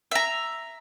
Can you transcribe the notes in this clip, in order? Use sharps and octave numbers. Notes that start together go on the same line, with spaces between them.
E5 A#5